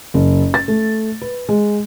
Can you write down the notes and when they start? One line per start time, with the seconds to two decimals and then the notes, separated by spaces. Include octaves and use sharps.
0.14 F#1
0.54 A6
0.68 A3
1.22 B4
1.49 G#3